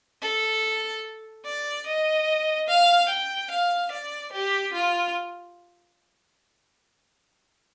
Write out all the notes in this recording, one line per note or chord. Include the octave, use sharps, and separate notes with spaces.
A4
D5
D#5
F5
G5
F5
D5
G4
F4